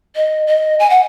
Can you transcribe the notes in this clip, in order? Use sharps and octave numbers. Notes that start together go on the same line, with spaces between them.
D#5
D#5
G#5
F#5